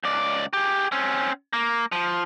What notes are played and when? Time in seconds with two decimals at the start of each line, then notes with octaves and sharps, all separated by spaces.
0.04 C#2 D5
0.53 G4 G#4
0.92 C4 C#4
1.53 A#3
1.92 F3